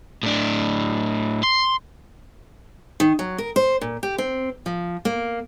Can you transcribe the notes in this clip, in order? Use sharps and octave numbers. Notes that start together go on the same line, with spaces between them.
A2 D4
C6
D#3
F#3
A#4
C5
A#2
G4
C4
F3
A#3